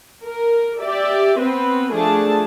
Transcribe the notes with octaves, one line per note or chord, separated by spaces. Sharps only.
A#4
G4 D5 E5
B3 C4 B4
F3 A3 D4 G#4 A5